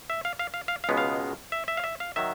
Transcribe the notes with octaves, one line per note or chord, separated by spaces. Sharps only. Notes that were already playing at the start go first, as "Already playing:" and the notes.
E5
F5
F5
F5
F5
F5
C#2 B2 G#3 B3
F5
E5
E5
F5
E5
F5
D#3 F#3 E5